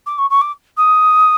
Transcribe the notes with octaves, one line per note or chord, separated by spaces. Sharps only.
D6
C#6
C#6
D6
D#6